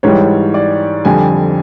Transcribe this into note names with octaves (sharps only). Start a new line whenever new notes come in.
G#2 E3 G3 C#5
D5
F2 D3 G3 G#5